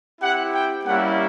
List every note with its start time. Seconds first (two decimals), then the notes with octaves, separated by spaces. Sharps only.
0.21 C4 E4 G4 F#5
0.53 G5
0.85 G3 A#3 C#4 E4 G4 F#5